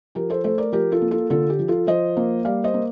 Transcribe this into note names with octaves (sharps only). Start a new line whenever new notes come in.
F3 G4 A#4
A4 C5
A3 A4 C5
A#4 D5
F3 G4 A#4
F4 A4
A#3
F4 A4
D3 F4 A4
G4
F3
F4 A4
F3 C5 D#5
A#3
G3 D5 F5
C5 D#5
A#3